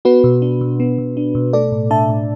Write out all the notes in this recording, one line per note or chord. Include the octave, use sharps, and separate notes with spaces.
B3 F#4 B4
B2
D4
B2
B3
B2
D4
B2
A3 A4 D5
A2
D4 E5 A5
A2